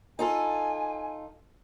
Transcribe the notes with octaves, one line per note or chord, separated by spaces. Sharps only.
D#4 F4 A4 G#5